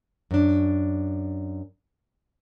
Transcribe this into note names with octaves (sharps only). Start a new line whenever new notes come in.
F#2 D4